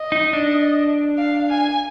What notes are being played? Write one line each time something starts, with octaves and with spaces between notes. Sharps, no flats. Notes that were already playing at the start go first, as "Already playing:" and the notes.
Already playing: D#5
D#4
D4
F5
G#5